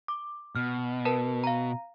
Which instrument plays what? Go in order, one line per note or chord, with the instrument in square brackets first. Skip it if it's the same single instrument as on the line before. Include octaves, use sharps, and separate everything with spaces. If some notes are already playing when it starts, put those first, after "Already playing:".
[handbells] D6
[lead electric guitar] B2 [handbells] F6
[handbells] A#4 B4 A5
F5 A#5